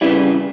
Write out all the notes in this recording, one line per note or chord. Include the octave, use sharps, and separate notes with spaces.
C#3 E3 G3 E4